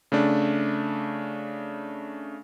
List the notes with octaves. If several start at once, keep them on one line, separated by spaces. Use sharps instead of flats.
C#3 A3 D4